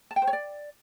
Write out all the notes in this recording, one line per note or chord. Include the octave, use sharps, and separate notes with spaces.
A5
G5
C5
C#5
D5